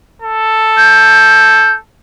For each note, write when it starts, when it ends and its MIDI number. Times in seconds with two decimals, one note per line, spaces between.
0.22 1.79 69
0.77 1.71 91